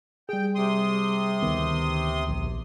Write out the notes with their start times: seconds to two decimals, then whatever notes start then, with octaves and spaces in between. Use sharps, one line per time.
0.29 G3 G#4 G5
0.55 C3 C6 D#6
1.42 D2 D#3 B3
2.28 A#1